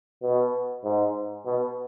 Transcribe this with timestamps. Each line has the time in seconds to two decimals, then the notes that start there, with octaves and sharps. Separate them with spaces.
0.22 B2
0.84 G#2
1.46 B2